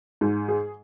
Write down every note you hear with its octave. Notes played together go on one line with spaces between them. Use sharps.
G#2
G#4